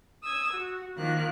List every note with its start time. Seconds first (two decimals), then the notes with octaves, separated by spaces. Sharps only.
0.24 D#6 E6 G#6
0.52 F#4
0.97 D#3 F3 A#3 F#6